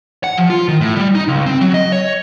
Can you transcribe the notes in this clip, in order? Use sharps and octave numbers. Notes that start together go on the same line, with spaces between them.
F#5
F3
F4
D#3
A2
G3
D#4
C#2
C4
F#3
D#5
C#5